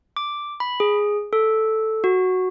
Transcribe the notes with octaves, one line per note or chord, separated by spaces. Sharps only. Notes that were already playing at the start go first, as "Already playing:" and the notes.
D6
B5
G#4
A4
F#4